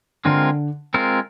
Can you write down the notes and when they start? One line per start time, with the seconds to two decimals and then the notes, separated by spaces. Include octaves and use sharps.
0.25 D3 G#3 C4 F4 A#4
0.94 G#3 C4 F4 A#4